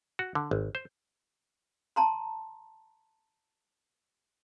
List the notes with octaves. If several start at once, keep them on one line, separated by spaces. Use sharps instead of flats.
F#4
D3
G#1
C5
A5 A#5 C6